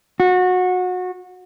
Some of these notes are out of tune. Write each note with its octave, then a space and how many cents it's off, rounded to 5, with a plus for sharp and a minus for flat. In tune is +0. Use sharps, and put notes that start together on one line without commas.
F#4 -25